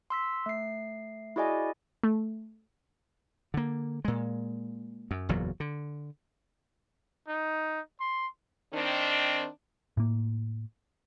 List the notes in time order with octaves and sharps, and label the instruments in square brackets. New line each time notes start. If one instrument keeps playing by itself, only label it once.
[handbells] C6 E6 B6
A3 C7
E4 F#4 G#4 D5 D#5 G#5
[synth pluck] A3
[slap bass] D3 A#3
A#2 G#3
F#2
F#1 E2 A#2 F#3
D3
[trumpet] D#4
C6
[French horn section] D#3 C4 D4
[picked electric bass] A2 A#3